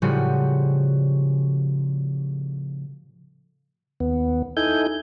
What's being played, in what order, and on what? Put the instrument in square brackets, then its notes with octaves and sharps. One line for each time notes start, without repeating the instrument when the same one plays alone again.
[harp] A2 C#3 F3 G3 C#4 F#4
[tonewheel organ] D#2 B3
D#4 E4 A4 G#5 G6